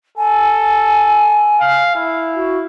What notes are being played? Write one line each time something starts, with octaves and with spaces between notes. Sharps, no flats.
A4 G#5
F5
E4
F#4